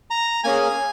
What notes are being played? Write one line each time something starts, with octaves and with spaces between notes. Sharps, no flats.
A#5
A#3 C#4 G#4 G#5